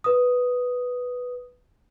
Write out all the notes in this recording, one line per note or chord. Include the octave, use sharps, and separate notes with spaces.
B4 D#6